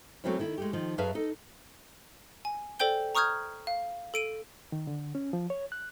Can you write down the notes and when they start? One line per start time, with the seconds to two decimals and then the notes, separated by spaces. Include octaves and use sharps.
0.24 F#3 A3 A#3 C4 C#4 E4
0.39 D#3 E4
0.58 G#3 A3 G4
0.73 D#3 F3
0.98 F#2 G#4 B4 E5 F5 A5
1.15 D#4 A4
2.45 G#5
2.80 A4 C5 D5 G5 G6 G7
3.15 A#5 C#6 D#6 F6 G6 G#6
3.67 F5
4.14 A4 D7 D#7
4.72 D#3
4.87 D3
5.15 C#4
5.33 F3
5.50 C#5
5.72 F#6